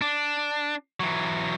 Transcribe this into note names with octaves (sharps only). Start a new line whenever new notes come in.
D4
E3 F#3